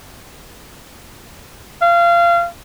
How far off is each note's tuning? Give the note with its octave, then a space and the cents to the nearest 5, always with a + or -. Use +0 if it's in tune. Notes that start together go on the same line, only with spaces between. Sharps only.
F5 -25